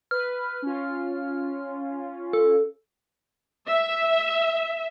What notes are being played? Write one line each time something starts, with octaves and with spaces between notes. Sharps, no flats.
B4 F6
C#4 F4
A4
E5